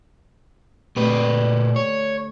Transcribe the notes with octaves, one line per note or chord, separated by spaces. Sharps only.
A#2 D3 A3 G4 B4
C#5